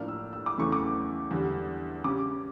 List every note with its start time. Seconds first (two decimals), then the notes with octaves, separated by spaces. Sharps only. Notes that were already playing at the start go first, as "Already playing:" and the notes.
Already playing: A2 F3 A#3 D4 F6
0.08 E6
0.33 E6
0.46 D6
0.58 E2 C#3 E3 A3 C#6
0.72 D6
1.31 E2 D3 G3
2.04 C#3 G3 C#4 D6